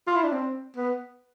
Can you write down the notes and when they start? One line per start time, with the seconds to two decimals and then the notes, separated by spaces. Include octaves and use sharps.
0.07 F4
0.15 E4
0.24 D4
0.32 C4
0.76 B3